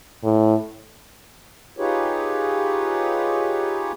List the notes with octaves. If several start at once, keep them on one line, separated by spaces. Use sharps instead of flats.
A2
D#4 F4 G4 G#4 B4 C#5